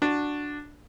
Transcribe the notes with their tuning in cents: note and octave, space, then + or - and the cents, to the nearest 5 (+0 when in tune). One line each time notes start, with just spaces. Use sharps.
D4 +0 F#4 -10